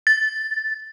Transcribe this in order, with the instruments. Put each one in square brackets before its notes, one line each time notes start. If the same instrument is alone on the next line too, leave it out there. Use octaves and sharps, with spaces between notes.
[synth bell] A6